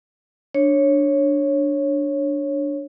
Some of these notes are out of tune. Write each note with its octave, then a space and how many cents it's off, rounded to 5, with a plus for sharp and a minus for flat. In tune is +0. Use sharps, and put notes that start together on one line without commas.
D4 +0 C#5 -10